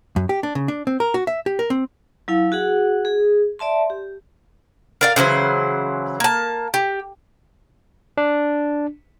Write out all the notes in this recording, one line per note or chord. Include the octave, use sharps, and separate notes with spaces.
F#2
G4
D4
C#3
D4
C4
A#4
F#4
E5
G4
A#4
C4
F#3 E4 F5
F#4 G#4 F#5
G#4
D5 E5 A5 C6
G4
A#4 D5 F5
C#3 E3 F#3 C5
A#3 A5
G4
D4